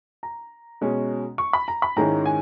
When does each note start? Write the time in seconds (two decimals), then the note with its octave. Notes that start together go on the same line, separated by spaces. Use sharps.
0.23 A#5
0.81 B2 G#3 C#4
1.38 C#6
1.53 B5
1.68 A#5
1.82 B5
1.96 G#2 D#3 G#3 C#4 E4 A#5
2.26 G#5